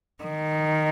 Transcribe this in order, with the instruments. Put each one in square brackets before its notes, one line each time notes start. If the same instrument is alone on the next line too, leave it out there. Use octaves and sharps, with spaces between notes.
[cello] D#3